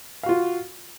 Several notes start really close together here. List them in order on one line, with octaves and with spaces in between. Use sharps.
F5 F#4 F4